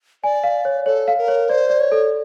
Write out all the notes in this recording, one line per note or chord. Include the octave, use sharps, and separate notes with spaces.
D5 G#5
F5
C#5
A4 C#5
F5
A#4
C#5
C5 D5
D5
C#5
A4